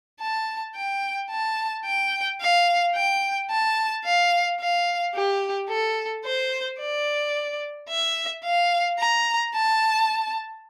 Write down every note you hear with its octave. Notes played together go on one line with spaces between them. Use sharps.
A5
G5
A5
G5
F5
G5
A5
F5
F5
G4
A4
C5
D5
E5
F5
A#5
A5